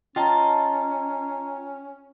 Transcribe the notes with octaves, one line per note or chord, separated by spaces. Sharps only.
C#4 F4 D#5 G5 A5 A#5